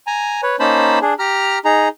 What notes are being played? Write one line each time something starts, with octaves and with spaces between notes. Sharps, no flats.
G#5 A#5
B4 C#5
A#3 C#4 D#4 C5 A5 B5
D4 G#4
G4 A#5 F6
D#4 G#4 A#5